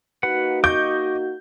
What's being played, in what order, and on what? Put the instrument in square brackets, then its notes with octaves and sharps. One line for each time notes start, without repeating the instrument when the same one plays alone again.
[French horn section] A#3 D#4 F#4 [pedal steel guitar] B4 F#5
[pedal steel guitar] D#5 C#6 D6 [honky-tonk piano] G6